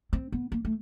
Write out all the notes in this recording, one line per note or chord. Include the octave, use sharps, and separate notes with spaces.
C4
B3
A#3
A3